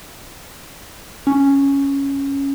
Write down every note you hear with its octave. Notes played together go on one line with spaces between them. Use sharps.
C#4